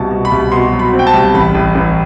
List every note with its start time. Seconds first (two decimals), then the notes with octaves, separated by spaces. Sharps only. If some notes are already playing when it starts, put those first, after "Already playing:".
Already playing: C2 B2 A5
0.11 B2
0.25 B5
0.32 C2
0.52 B2 C6
0.73 F#3
0.79 B5
0.93 C4
0.99 G5
1.07 A5
1.14 C2
1.34 A1 B5
1.55 A1
1.75 A1